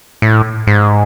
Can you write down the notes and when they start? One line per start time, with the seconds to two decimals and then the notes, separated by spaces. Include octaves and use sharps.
0.22 A2
0.67 G#2